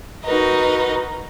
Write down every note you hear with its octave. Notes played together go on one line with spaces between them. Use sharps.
D#4 F#4 A#4 B4 D#5